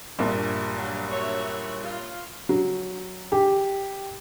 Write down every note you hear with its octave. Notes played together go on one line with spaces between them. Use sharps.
A#1 G2 A#2
F#3 F5
F#4 C#5 E5
F4
F#3
G4